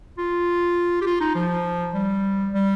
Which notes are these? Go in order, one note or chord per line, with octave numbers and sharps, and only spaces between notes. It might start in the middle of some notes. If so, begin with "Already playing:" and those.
F4
G4
F4
D#4
F3
G3
G3